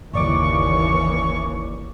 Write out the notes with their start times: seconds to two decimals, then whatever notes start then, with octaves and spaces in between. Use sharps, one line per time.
0.14 G1 D#2 C#3 E3 D5 C#6 D6